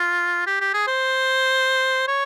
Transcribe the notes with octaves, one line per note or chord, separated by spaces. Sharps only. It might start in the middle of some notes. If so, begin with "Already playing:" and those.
Already playing: F4
G4
G4
G#4
C5
C#5